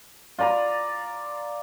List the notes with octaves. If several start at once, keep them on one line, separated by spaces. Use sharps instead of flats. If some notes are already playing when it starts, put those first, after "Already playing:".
F4 D5 A#5 B5